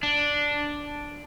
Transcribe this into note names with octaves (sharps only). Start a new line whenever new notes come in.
D4